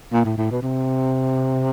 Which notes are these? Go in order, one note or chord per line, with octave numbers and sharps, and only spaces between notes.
A#2
A2
A2
B2
C3